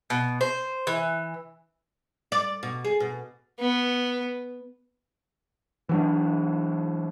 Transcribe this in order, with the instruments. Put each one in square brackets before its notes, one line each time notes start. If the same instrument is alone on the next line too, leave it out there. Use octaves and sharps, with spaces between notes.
[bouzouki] B2
C5
E3
[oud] D5
B2
G#4
B2
[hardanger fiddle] B3
[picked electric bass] E3 F#3 D4